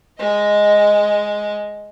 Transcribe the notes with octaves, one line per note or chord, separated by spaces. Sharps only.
G#3 D#5